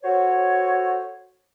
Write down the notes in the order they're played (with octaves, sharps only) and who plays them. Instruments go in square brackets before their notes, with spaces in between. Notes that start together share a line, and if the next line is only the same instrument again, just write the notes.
[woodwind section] F#4 A4 C5 C#5